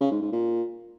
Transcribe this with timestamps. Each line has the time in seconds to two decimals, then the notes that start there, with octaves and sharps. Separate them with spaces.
0.01 C#3
0.11 G#2
0.22 G#2
0.32 A#2